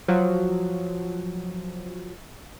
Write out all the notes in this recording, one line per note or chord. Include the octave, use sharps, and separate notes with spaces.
F3 F#3